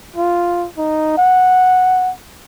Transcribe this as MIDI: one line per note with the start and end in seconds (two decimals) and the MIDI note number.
0.16 0.67 65
0.78 1.15 63
1.18 2.12 78